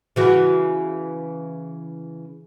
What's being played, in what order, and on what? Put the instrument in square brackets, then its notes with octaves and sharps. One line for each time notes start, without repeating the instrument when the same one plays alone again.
[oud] C#3 E3 F#4